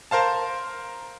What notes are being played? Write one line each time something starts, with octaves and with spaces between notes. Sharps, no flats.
A#4 C5 F5 A5